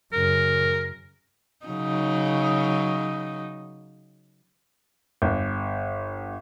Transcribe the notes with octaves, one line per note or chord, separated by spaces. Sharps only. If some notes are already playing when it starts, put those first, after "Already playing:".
F#2 C#3 A#4
C#3 F#3 D#4
G1